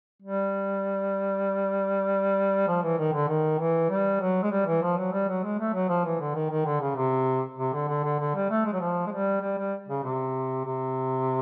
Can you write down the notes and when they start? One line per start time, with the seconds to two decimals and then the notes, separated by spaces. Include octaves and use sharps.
0.22 G3
2.68 F3
2.83 E3
2.98 D#3
3.13 D3
3.29 D#3
3.60 E3
3.90 G3
4.21 F#3
4.43 G#3
4.52 G3
4.66 E3
4.82 F3
4.98 F#3
5.13 G3
5.28 F#3
5.44 G#3
5.59 A3
5.74 F#3
5.89 F3
6.05 E3
6.20 D3
6.35 D#3
6.51 D#3
6.66 D3
6.81 C#3
6.96 C3
7.58 C3
7.74 D3
7.89 D3
8.04 D3
8.20 D3
8.35 G3
8.50 A3
8.66 G#3
8.73 F#3
8.81 F3
9.07 G#3
9.11 G3
9.42 G3
9.58 G3
9.89 C#3
10.04 C3
10.65 C3